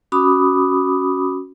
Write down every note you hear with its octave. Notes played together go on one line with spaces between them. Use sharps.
C#4 F#4 B5 D6 D#6